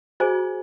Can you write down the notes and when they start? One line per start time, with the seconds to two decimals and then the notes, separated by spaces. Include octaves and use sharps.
0.20 F#4 G#4 C5 D#5 G#5